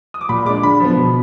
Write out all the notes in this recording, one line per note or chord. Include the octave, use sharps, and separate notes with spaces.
D#6
D6
A#2 B5
G#3 D4 D6
D3 B5
F3 B3
B2